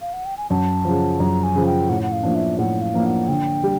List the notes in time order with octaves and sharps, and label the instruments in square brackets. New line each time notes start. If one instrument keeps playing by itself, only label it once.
[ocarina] F5
F#5
G5
G#5
[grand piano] F#2 [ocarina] A5
[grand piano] C#3 F3
[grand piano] F#2 [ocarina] A#5
[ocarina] G#5
[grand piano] C#3 F3
[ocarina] G5
[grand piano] A2 [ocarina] F#5
[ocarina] F#5
F5
[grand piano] F3 A#3 D4
[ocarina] E5
[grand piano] A2 [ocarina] F#5
[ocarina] F5
[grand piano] F3 A#3 D4
[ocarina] F#5
[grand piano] D3 [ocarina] G5
[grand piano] G3